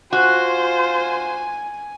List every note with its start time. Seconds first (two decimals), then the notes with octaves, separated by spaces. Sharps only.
0.13 F4 F#4 C5 G#5